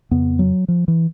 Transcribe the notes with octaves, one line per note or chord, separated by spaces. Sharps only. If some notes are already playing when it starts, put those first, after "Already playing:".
F2 C#3 B3
F#3
F3
E3